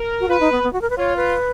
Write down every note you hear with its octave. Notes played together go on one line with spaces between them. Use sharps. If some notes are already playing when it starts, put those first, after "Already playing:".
Already playing: A#4
F#4
F4 B4
D#4
B3
B3
F#4
A#4
B4
F4 C#5
B4